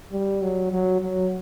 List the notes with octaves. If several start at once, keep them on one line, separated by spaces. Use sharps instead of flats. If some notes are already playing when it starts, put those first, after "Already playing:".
G3
F#3
F#3
F#3